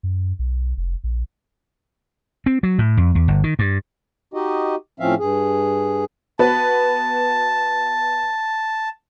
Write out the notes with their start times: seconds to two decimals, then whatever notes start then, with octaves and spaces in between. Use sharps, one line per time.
0.03 F#2
0.39 B1
0.77 F1
1.04 A#1
2.46 C4
2.63 F#3
2.79 A2
2.97 F2
3.15 E2
3.28 G1
3.44 D#3
3.59 G2
4.34 D#4 F#4 G4 D#5
5.00 A2 F3 C4 C#4 E5 F5
5.19 G2 G#4
6.39 B3 F#4 B4 A5